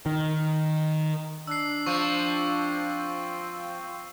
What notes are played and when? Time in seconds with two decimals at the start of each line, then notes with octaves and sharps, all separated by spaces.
0.06 D#3
1.47 D4 E6 C7
1.86 F3 C4 F4 G5 C#6